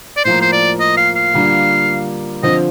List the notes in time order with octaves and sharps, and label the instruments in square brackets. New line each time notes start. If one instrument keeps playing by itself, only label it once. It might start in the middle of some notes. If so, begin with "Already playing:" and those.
[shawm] D5
[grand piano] A2 F3 A#3 [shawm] C5
[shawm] C5
D5
D#5
F5
F5
[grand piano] D3 G3 A#3 F4
[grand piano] D3 F3 C4 F4 [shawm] D#5